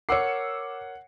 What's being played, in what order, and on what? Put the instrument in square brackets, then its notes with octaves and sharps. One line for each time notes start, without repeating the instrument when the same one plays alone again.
[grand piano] A#4 C#5 [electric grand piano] F#5 C7 [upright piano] D6 E6 C#7